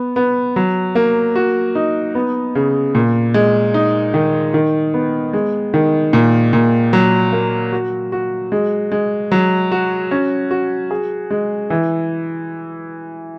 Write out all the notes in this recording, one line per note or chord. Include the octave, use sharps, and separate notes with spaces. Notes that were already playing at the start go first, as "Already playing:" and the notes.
Already playing: B3
B3
F#3
A#3
F#4
D#4
B3
C#3
A#2
G#3
D#4
D#3
D#3
B3
G#3
D#3
A#2
A#2
F#3
A#3
F#4
F#4
G#3
G#3
F#3
F#4
C#4
F#4
G#4
G#3
E3